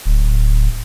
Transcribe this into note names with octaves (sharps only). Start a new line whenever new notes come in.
D1